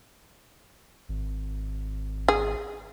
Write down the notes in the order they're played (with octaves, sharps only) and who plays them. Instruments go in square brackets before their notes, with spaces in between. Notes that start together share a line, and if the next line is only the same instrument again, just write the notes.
[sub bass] G#1
[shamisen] G#4